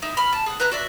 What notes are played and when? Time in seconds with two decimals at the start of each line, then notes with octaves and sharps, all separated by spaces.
0.02 D#4 E4
0.17 B5 F6
0.33 A5
0.46 G#4 F#5
0.60 B4 E5 A#5 F#6
0.71 F#4 D5 E5